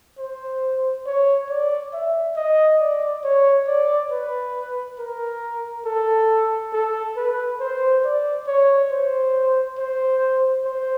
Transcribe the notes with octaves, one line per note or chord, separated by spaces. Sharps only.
C5
C#5
D5
E5
D#5
D5
C#5
D5
B4
A#4
A4
A4
B4
C5
D5
C#5
C5
C5
C5